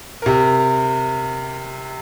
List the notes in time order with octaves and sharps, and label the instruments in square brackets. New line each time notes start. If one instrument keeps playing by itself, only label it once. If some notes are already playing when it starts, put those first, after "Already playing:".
[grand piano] C3 A#4